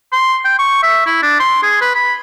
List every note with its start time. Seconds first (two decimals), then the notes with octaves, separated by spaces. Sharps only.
0.12 C6
0.45 G5
0.59 C#6
0.83 E5
1.06 E4
1.23 D4
1.40 C6
1.63 G#4
1.81 B4
1.95 B5